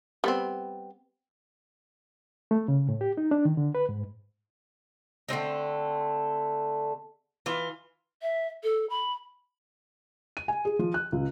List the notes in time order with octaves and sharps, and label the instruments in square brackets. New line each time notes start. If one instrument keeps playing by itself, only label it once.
[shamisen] G3 B3 C4
[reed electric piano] A3
C#3
A2
G4
D#4
D4
D#3
D3
B4
G#2
[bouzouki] D3 A3 C4 D#4
E3 F4
[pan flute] E5
A4
B5
[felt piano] D#7
G#5
G#4
F3
F#6
C#2